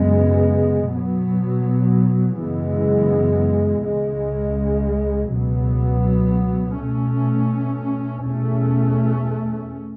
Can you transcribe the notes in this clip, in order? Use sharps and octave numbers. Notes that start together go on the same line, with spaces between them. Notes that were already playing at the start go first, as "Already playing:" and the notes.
Already playing: F#2 C#3 G#3 B3
B2 F#3 B3
F#2 C#3 E3 G#3 B3
C#2 C#3 G#3
C#2 B2 F#3 B3
B2 A3 C#4
E2 B2 A3 C#4